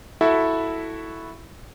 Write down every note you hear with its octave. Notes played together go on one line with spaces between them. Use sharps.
E4 F#4 A4 E5